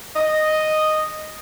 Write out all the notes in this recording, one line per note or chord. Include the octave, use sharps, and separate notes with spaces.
D#5